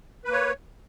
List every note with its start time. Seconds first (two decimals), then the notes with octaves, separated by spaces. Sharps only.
0.24 B4
0.28 A#3
0.33 C#5